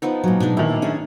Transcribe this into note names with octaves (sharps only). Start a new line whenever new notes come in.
F3 B3 D#4
A#2 F#3
B2 G#3 D4 D#4
A#2 D#3 E4
C#4 D4 G#4